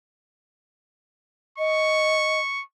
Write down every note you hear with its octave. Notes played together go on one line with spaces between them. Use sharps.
D#5 C#6